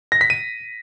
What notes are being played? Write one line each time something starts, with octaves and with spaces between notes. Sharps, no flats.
A#6
B6
D#7